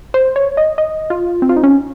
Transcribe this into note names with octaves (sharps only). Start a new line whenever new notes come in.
C5
C#5
D#5
D#5
F4
C4
F4
D#4
C#4